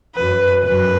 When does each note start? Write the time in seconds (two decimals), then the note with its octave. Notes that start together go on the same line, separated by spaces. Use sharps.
0.15 F#2 B4
0.63 F#2 B4